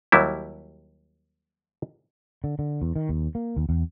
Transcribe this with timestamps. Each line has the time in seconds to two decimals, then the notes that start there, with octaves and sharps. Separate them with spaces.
0.12 D#2 F#3 G3 E4
2.44 D3
2.59 D3
2.82 E2
2.96 D#3
3.09 D#2
3.35 A#3
3.57 D#2
3.69 E2